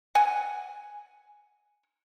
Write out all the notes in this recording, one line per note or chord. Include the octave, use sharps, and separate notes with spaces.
F#5 G#5